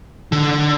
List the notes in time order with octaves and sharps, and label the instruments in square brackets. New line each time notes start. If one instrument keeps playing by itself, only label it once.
[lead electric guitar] D3